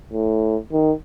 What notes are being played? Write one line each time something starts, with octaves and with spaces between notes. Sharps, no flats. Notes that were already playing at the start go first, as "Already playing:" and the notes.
A2
D#3